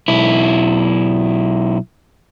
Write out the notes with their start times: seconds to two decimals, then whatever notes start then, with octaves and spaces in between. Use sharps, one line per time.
0.08 B1 E4